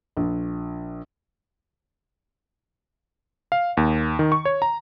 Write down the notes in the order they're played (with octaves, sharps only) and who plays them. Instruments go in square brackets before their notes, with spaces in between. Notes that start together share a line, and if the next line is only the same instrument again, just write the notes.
[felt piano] A#1
[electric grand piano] F5
D#2
D#3
C#6
C#5
A#5